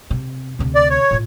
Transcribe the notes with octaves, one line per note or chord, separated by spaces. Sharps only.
C3
D2 C3
D5
C#5
A2 F4